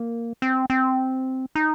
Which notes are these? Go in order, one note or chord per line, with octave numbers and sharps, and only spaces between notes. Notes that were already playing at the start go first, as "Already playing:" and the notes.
Already playing: A#3
C4
C4
D#4